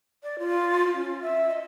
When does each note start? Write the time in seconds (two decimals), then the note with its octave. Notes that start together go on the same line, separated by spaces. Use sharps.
0.23 D5
0.39 F4
0.94 C#4
1.21 E5
1.49 D#5